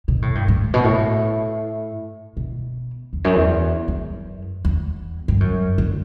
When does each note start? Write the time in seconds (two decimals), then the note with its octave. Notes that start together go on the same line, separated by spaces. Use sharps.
0.08 B2
0.22 A2
0.35 G2
0.48 A2
0.74 B2
0.84 A2
2.37 B2
3.13 E2
3.24 F#2
3.36 E2
3.88 F#2
4.65 E2
5.28 G2
5.40 F#2
5.78 D3